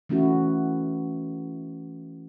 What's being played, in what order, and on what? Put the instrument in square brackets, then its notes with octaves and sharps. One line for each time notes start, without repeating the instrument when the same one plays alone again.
[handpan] E3 A3 C#4 E4 F#4